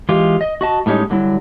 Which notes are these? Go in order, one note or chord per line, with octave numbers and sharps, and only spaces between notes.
E3 G#3 F4 G4
D#5
F#4 D#5 A5
A2 G3 G#3 C#4 D#4
D3 F#3 G3 E4